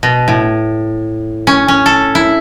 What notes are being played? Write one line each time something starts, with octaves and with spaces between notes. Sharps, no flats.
B2
A2
C#4
C#4
A4
E4